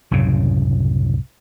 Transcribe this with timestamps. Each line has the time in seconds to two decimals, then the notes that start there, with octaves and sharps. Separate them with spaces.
0.11 C2 F#2 A2 C#3